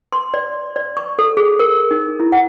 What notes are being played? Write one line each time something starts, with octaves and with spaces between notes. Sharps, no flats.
C6
D5
D5
C#6
A4
G#4
A#4
D#4
E4
F#5